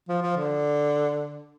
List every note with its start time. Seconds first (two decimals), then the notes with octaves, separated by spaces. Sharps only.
0.09 F3
0.22 F3
0.37 D3